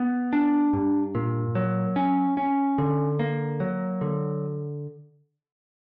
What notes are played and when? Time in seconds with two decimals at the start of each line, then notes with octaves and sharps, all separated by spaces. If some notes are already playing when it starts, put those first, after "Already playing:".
Already playing: B3
0.33 D4
0.73 G2
1.15 A#2
1.55 F#3
1.96 C#4
2.37 C#4
2.78 D3
3.19 A#3
3.60 F#3
4.01 D3